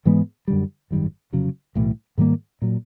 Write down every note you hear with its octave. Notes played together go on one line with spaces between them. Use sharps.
G#2 E3 G#3 B3
F#2 D3 G3
G#1 F#2 D#3 G3
F1 F2 C#3 F#3
B1 A2 E3
G#2 D#3 G3 A#3
A#2 F#3